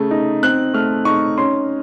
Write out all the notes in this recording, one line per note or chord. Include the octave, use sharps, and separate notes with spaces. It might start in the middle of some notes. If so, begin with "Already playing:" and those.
Already playing: C#3 A3
D#4
C4 F#6
A3 F6
D#4 C#6
C#4 C6